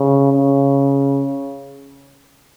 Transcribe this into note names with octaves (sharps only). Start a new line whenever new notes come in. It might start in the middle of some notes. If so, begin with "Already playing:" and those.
Already playing: C#3
C#3